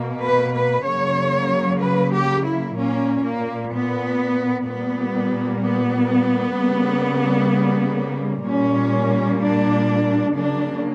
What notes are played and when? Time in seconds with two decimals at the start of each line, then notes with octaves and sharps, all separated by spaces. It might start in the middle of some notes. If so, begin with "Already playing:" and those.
Already playing: B2 A#3
0.24 B4
0.54 B4
0.86 C#3 F#3 A#3 C#5
1.81 B4
2.12 G4
2.45 E4
2.76 A#2 A#3 C#4
3.23 A#3
3.72 B3
4.67 A#2 G3 A#3 B3
5.61 B3
6.56 C#3 G3 A#3
8.46 A#2 G3 A#3 C#4
9.41 D4
10.35 C#3 F#3 A#3 D4